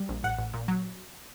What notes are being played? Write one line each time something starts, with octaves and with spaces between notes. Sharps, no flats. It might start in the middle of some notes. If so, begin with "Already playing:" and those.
Already playing: G3
A#1
A1 F#5
A1
A#2
F#3